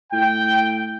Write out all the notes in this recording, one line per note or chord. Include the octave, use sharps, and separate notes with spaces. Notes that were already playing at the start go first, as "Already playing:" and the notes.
A2 G5